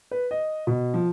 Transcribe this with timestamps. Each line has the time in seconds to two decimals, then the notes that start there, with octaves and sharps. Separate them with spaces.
0.11 B4
0.31 D#5
0.67 B2
0.94 F3